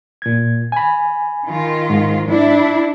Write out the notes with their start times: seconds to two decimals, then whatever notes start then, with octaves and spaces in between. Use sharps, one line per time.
0.22 A#2 G#6
0.72 G#5 B5
1.46 D#3 F4
1.90 G#2
2.27 D4 E4